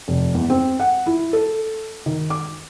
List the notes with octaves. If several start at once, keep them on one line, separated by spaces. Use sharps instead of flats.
F1
E2
C4
F#5
E4
A4
D#3
D6